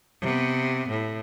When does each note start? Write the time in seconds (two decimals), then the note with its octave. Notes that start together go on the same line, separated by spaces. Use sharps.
0.21 C3 B3
0.89 A2